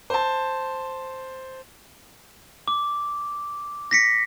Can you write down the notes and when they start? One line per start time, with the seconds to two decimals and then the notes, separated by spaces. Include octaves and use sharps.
0.10 C5 A5
2.68 D6
3.91 A#6 B6 C#7